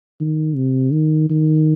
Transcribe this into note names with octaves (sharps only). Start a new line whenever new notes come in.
D#3
C3
D#3
D#3